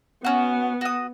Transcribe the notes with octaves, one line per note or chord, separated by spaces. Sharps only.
B3 C#4 F#4
F#4 D#6